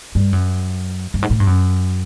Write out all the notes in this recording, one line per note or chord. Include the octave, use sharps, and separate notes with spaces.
G2
F#2
G2
G#2
A2
G2
F#2